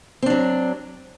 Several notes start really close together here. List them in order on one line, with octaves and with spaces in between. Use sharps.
C4 D4 F#3